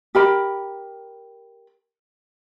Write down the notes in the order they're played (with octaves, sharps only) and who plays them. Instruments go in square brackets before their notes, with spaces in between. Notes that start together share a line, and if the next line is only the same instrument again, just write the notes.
[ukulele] G4 A#4 B5